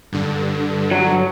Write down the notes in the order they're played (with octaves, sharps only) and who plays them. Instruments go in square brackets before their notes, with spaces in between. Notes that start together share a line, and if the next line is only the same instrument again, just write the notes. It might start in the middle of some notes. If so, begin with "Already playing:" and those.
[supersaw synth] G2 D3
[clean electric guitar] F#3